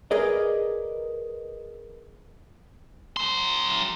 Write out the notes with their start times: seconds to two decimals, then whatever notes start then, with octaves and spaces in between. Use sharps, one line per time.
0.11 G#4 A#4 B4 D5 D#5
3.17 F#3 C6